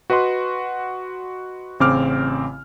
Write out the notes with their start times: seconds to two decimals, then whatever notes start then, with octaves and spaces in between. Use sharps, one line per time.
0.10 F#4 B4 D#5 F#5 C6
1.80 A1 C#3 C4 D6 F6